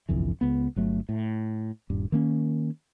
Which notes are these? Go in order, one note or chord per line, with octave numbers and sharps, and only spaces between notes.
G1 C2 F2 E3
C#2 B3
G1 F#3 A3
A2
D#1 G2
D#3 A#3 C#4